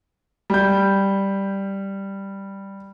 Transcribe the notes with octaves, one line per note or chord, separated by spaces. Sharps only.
G3 G6